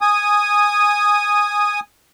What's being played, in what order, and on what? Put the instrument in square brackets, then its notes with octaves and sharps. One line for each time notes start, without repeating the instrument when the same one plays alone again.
[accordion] G#5 D#6